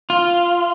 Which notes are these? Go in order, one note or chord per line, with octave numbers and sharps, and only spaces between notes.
F4